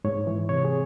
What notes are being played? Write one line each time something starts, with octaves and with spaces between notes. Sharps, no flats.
G#2 C#5
E3
C3 C#5
G#4